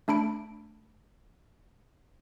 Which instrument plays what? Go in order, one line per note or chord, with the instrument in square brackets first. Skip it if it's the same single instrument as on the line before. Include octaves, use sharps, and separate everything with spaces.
[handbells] A3 D4 B5 D7